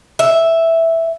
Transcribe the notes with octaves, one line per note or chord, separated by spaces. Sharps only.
E5